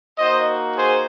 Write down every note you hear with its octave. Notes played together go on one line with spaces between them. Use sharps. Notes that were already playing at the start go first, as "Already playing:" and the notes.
A#3 D#4 F#4 C5 D#5
G#4 C5